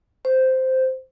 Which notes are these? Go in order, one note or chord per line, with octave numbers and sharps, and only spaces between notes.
C5